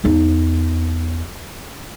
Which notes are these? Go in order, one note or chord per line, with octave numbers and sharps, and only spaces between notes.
E2 D#4